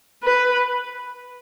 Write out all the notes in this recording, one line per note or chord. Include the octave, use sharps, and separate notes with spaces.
B4